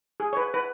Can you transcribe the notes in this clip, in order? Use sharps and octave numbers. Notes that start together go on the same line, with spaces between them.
G#4
C#5
B4
B4